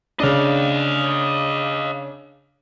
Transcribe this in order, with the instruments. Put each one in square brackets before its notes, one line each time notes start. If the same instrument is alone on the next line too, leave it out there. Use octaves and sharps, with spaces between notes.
[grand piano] C#3 D4 [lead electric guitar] D#5 F5